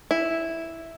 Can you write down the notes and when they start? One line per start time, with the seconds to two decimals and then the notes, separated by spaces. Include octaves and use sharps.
0.11 E4